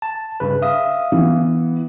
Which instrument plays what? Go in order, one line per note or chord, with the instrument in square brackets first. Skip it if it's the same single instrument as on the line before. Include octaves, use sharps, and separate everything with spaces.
[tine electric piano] A5
G2 C#3 B4
E5 F5 D#6
[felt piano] E3 B3